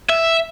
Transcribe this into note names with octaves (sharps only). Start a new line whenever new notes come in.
E5